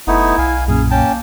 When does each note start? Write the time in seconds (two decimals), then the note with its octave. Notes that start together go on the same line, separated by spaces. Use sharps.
0.07 F#1 A3 B3 D#4 E4
0.38 B1 F5 G#5
0.68 F#2 A#2 C#4 G#4
0.91 A#3 C#4 G5 A5